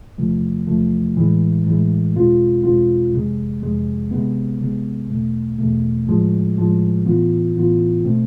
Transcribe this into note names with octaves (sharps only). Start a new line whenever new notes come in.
E2 C3 F3 A3
E2 C3 F3 A3
A2 E3 G#3
A2 E3 G#3
E2 B2 G#3 C4 F4
E2 B2 G#3 C4 F4
F2 C3 G#3
F2 C3 G#3
C3 G#3 B3
C3 G#3 B3
E2 B2 A3
E2 B2 A3
A2 F3 G#3
A2 F3 G#3
A2 E3 B3 F4
A2 E3 B3 F4
B2 A3 C4